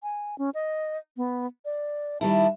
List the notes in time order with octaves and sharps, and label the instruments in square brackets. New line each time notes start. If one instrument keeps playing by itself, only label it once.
[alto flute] G#5
C#4
D#5
B3
D5
[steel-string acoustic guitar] D#3 G3 E4 [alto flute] A5